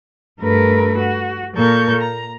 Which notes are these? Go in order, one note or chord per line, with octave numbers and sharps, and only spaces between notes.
G2 A3 A#4 B4
F#4
A#2 A#3 A4 A#4 C#6 G6
A#5